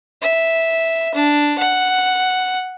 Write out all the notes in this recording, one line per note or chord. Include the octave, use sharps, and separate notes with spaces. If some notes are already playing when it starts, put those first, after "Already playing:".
E5
D4
F#5